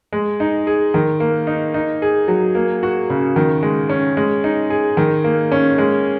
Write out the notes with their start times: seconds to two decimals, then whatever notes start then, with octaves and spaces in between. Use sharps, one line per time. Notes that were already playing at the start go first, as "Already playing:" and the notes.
0.12 G#3
0.40 D#4
0.67 G#4
0.94 D#3
1.20 A#3
1.47 D#4
1.74 D#4
2.02 G#4
2.28 F#3
2.55 A#3
2.83 F#4
3.10 C#3
3.36 D#3
3.63 G#3
3.89 C#4
4.17 G#3
4.44 D#4
4.70 G#4
4.97 D#3
5.24 A#3
5.52 C#4
5.78 G#3